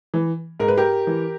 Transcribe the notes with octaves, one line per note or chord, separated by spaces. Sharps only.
E3
G#2 A#4
B4
G4 A#4
E3